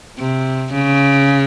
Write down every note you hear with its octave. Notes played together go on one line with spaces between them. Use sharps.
C3
C#3